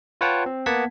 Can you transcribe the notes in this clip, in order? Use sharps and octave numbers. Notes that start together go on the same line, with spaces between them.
F4 B4 C#5 F#5 G5 A5
C4
A#3 B3 F#5 A5 G#6 B6